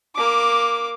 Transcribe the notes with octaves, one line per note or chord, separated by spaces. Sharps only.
A#3 D6